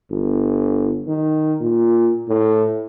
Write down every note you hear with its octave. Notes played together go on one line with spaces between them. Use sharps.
G1
D#3
A#2
A2